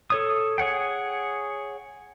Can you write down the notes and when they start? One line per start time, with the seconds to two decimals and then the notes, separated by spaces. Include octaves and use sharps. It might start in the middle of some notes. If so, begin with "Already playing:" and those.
0.10 A4 C#5 D#6
0.58 G#4 C#5 F#5 G5